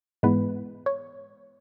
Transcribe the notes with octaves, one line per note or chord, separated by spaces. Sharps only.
G#2 E3 G#3 B3 B4
C#5